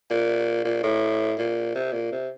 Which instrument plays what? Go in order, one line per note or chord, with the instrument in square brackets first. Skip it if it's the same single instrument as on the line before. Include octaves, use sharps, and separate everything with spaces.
[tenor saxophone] A#2
A#2
A2
A#2
C3
A#2
C3